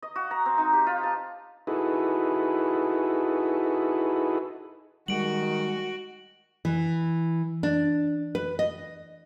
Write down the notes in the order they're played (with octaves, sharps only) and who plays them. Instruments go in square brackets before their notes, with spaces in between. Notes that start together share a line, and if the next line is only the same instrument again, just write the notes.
[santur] D#5
F#4
A#5
C4
D#4
G4
F4
A5
[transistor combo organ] D#4 E4 F#4 G#4 A4 B4
[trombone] D#3 [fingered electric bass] G3 G#3 [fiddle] F#4 [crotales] D7 F#7
[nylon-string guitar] E3
D4
B4
D#5